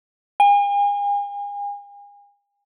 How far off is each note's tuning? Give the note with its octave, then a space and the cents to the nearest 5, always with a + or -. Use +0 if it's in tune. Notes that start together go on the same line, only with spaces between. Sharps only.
G#5 -40